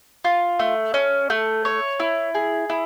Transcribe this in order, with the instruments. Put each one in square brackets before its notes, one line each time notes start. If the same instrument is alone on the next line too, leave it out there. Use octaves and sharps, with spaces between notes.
[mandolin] F4
A3
C#4
A3
C#5
E4
G#4
E4